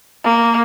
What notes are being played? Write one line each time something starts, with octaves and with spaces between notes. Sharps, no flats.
A#3